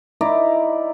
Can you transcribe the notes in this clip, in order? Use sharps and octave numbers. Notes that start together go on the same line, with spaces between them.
D#4 E4 D5 A#5